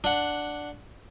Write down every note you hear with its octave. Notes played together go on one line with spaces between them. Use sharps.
D4 F#5